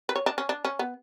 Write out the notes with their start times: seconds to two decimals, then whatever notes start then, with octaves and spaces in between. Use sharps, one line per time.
0.09 B4
0.16 C#5
0.26 D4
0.38 C#4
0.49 D4
0.65 C#4
0.79 B3